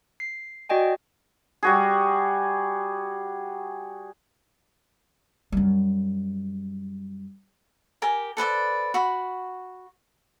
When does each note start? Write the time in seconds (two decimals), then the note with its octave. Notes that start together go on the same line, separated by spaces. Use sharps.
0.20 C7
0.69 F#4 D5 D#5 G5 G#5
1.63 G3 F#4 G#4
5.52 F#2 G3
8.02 G4 A#4 G#5
8.37 A4 B4 C5 D5
8.94 F#4 B5